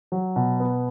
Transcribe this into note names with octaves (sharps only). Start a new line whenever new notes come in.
F#3
B2
B3